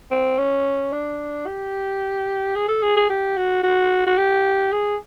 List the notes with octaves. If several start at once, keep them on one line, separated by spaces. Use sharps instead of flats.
C4
C#4
D4
G4
G#4
A4
G#4
G#4
G4
F#4
F#4
F#4
G4
G#4